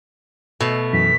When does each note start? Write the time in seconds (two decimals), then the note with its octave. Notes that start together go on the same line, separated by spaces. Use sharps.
0.60 B2 A3
0.93 F#2 E3 B6